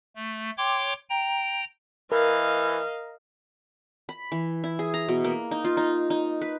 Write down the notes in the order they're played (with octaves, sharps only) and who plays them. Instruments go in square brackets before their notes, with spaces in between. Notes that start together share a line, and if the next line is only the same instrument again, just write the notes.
[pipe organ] A3
C#5 G5 C6 D6
G5 A#5
[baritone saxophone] E3 [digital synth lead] A#4 [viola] D#5 F5
[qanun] B5
E3
E4
G#4
A#5
B2
A#3
D#4
F4
D#4
D#4
B4